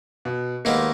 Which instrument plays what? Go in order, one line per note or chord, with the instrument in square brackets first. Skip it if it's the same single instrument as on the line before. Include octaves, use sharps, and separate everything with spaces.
[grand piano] B2
[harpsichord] D#2 D#3 G#3 B3 [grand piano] A#3